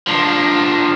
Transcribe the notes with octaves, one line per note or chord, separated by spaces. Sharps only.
F3 D4